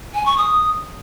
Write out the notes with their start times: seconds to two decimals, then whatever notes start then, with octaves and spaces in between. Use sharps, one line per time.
0.14 G#5
0.26 C#6
0.38 D#6